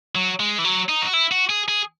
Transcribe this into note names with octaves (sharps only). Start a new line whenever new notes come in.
F#3
G#3
E3
F#3
D#4
F#4
E4
F#4
G#4
G#4